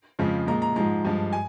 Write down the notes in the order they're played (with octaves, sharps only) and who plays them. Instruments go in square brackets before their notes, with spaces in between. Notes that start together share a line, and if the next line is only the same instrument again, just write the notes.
[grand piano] F2 C#3 F3 G#3
A#2 G#3 A#5
A#5
G#2 F3 G#3 A#5
G2 F3 G#3
G#5